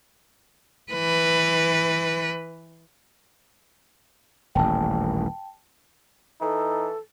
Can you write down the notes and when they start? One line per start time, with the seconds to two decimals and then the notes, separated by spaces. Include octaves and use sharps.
0.92 E3 B4
4.55 D#1 A1 G5 A5
6.41 E3 D#4 A4